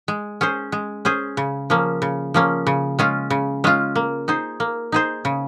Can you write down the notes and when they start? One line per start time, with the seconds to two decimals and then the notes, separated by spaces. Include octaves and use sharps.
0.08 G#3
0.41 C#4 G#4 C5
0.72 G#3
1.05 C#4 G#4 C5
1.37 C#3
1.70 F3 A#3 C#4
2.02 C#3
2.34 F3 A#3 C#4
2.67 C#3
2.99 G#3 C#4 F4
3.30 C#3
3.64 G#3 C#4 F4
3.96 A#3
4.28 D#4 G#4 C5
4.60 A#3
4.92 D#4 G#4 C5
5.25 C#3